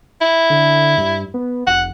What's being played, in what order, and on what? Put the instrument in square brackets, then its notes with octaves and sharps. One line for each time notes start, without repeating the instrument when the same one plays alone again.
[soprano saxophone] E4
[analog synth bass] D3
G2
B3
[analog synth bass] F1 [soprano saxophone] F#5